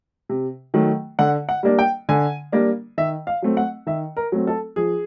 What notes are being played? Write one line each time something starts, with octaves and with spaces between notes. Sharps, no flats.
C3
D#3 F#3 A3
D3 F#5
F#5
G3 A#3 D4
G5
D3 G#5
G3 A#3 D4
D#3 E5
F5
F#3 A3 C4
F#5
D#3 E5
A#4
F#3 A3 C4
A4
F3 G#4